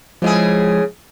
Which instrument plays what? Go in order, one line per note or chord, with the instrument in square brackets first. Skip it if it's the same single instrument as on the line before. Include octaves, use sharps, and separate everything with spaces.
[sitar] C#3 E4 G#4 [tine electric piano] F3 G#3